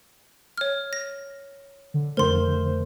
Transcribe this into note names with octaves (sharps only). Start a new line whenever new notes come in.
C#5 F6
A#6
D3
F2 D3 A3 A#4 C5 C6